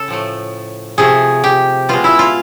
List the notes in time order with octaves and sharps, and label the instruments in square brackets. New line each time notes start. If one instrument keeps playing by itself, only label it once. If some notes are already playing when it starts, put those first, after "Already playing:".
Already playing: [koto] C#3 A4
A2 F3 A3
C3 F3 A3 G#4
G4
B2 G#3 F4
E4
F4